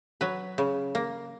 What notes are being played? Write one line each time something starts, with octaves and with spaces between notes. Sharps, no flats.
F#3 B4
C#3
A#3